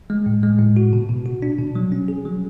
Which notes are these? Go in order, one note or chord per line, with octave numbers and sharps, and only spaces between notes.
G#3
A2
G#3
A2
F#4
B2
B2
F#4
D4
B2
F#3
C#4
G#4
F#3